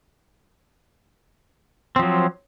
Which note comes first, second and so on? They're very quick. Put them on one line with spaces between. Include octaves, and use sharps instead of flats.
C4 F3 F#3